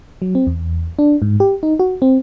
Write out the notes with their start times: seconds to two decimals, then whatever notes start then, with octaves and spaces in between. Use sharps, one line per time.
0.22 F#3
0.35 C4
0.47 E2
0.99 D4
1.22 G#2
1.40 G4
1.63 D#4
1.80 F#4
2.02 C4